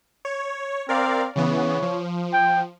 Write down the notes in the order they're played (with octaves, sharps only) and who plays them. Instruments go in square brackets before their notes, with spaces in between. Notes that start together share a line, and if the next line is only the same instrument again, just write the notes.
[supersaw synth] C#5
[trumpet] C4 [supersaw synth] A#4 D5 F5
[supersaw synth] C#3 E3 B3 [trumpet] C#5
[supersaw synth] F3
[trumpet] G5